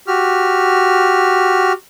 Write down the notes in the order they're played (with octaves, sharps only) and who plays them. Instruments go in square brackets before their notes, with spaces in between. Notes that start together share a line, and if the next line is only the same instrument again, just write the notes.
[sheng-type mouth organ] F#4 G4 F6